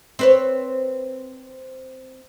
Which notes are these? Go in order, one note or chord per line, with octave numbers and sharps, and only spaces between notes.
C4 B4 C#5